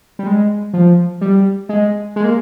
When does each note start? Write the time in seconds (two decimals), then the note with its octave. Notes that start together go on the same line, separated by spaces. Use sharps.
0.19 G3
0.27 G#3
0.74 F3
1.21 G3
1.69 G#3
2.16 G#3
2.24 A#3